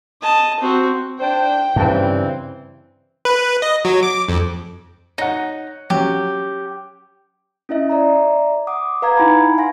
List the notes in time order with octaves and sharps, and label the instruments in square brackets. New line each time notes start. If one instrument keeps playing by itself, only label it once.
[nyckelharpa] D#5 A5
C4 F#4
[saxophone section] D4 C5 [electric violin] G5
[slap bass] G2 C#3 [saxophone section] E3 C4
[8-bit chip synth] B4
D#5
F#3
D6
F2
[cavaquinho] D#4 [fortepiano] C#5 F#5
[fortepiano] F#3 C#4 [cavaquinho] G4
[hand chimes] C#4 E4 D#5 E5
D5 E5 A#5
F#5 D6 D#6
B4 F5 A#5 G#6
D#4 E4 F#5 G#5 B5
F5 G#5 C6 A#6